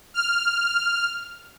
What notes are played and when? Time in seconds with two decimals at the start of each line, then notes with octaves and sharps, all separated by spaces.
0.14 F6